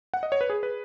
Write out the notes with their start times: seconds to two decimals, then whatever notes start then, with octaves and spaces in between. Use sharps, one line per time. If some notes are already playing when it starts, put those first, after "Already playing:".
0.14 F#5
0.23 D#5
0.32 C#5
0.41 B4
0.50 G#4
0.63 B4